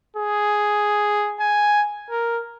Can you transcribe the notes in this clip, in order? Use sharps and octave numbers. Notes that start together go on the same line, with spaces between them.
G#4
G#5
A#4